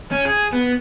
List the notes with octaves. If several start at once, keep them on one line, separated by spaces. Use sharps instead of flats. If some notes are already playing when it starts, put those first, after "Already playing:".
C#4
G#4
B3